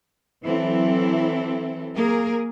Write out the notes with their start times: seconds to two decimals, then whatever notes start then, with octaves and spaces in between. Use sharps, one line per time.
0.43 E3 F#3 C4 E4 A4
1.95 A#3 G#4 A#4